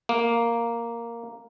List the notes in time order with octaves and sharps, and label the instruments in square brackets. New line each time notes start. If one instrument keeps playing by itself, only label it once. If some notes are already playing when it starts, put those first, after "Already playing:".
[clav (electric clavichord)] A#3